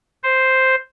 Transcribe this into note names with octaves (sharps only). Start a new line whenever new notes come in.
C5